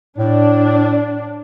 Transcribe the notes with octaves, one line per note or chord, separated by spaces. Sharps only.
A2 D4